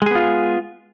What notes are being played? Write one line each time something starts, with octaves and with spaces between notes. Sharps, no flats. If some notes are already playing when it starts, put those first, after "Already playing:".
G#3 B3 F4 G#4